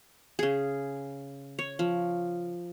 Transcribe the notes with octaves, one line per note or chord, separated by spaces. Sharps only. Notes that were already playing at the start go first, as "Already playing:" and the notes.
C#3 G#4
C#5
F3